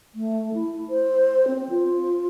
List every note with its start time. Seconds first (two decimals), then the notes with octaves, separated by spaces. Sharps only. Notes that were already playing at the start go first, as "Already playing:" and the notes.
0.15 A3
0.54 E4
0.90 C5
1.48 C4
1.69 F4